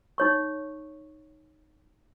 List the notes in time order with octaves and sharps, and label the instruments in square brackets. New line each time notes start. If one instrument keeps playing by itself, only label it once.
[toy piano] D#4 C#5 C#6